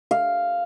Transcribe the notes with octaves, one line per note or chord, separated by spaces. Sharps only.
F5